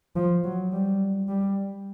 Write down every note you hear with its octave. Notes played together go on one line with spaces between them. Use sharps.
F3
F#3
G3
G3